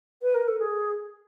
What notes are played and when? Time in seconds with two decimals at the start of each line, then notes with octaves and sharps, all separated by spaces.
0.22 B4
0.34 A#4
0.47 A4
0.59 G#4